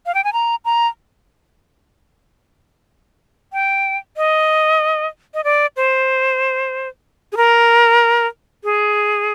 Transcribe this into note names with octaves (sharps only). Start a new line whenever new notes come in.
F5
G5
G#5
A#5
A#5
G5
D#5
D#5
D5
C5
G#4
A#4
G#4